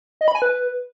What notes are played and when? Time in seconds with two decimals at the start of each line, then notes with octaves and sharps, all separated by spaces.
0.21 D#5
0.28 B5
0.35 G#5
0.42 B4